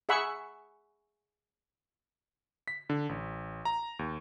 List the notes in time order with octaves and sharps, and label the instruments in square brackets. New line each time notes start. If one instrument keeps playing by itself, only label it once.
[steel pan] G#4 E5 F#5 B5 C#6
[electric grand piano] B6
D3
A1
A#5
D#2